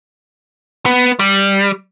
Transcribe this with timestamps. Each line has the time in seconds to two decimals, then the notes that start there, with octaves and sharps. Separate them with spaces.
0.86 B3
1.19 G3